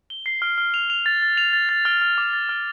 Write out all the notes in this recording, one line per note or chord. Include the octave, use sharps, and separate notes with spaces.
G7
C7
F6
F6
F7
F7
A6
A6
F7
A6
A6
F6
F6
D6
A6
F6